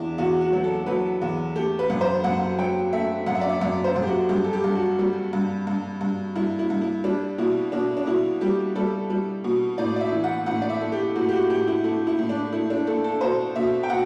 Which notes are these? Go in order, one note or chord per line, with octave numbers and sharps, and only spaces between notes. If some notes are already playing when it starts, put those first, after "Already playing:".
Already playing: E2 D4 E4
E2 F#4
F#4
F#3
A4
F#3 B4
E2
A3 G4
B4
F#2
C5
F#2 F#5
F#3 G5
A3 E5
F#2 F#5
E5
D5
E5
F#2 D5
C5
F#2
G4
F#4
G2 G4
A4
G4
G2
F#4
G3
G2
G2
G2
G2 E4
E4
G2
E4
G3 D4
B2 E4
B2 D4
D4
B2 E4
G3 G4
G3 A4
G3
B2
A2 D5
D5
E5
E3
F#5
A2 F#5
D5
E5
A3
G4
A2 F#4
G4
F#4
A2 G4
E4
A3 E4
E4
A2
D4
A3 E4
D4
A3 A4
A4
B2 C5
B2 E5
G5
B2 F#5